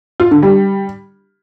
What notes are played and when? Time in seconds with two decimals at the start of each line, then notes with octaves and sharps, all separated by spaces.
0.20 F4
0.31 D3
0.43 G3